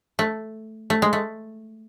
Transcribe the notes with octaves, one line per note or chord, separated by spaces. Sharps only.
A3
A3
G#3
A3